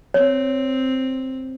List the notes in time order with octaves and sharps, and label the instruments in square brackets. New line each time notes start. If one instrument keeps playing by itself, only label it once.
[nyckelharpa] C4 [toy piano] C#5